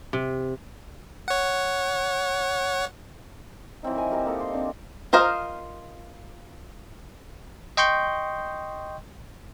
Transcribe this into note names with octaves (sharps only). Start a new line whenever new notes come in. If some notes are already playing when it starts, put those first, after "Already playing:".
C3
C#5 F#5
E3 F#3 C4 D#4
A#4 G#5
G4 A#4 E5
A#3 D#4 A4
C6
C4 D4
F4 A#4 C5 D#5 F5
D#5 G5 C6 C#6 G6